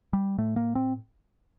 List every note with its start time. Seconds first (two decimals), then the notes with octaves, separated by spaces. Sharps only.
0.13 G3
0.38 A2 A3
0.56 A#3
0.75 C4